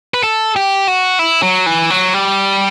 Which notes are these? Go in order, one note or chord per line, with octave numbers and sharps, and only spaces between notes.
B4
A4
G4
F#4
E4
F#3
E3
F#3
G3